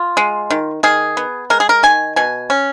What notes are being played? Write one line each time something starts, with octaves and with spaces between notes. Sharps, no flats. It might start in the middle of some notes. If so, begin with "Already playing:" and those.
Already playing: F4
G#3
D#3
D#3 G#4
B3
G#3 A#4
G#4
A#4
D#3 G#5
B2 G#5
C#4